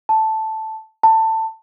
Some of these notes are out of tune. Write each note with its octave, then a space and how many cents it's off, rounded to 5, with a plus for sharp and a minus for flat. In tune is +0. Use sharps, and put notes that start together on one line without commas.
A5 +0
A5 +20